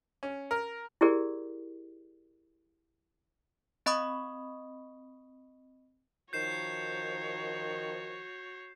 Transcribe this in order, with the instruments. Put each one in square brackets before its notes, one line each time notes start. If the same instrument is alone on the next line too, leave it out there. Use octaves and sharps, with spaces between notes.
[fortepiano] C#4
A#4
[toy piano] E4 G4 G#4 A#4 D5
[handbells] C4 D#5 B5 C#6 D#6
[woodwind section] D#3 F3 [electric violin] F#4 C#5 [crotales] G6 C7 E7